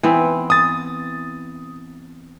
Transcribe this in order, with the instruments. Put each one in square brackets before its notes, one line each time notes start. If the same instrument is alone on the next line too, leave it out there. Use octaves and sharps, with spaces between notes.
[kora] E3 B3 C4
[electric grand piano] D#6 A6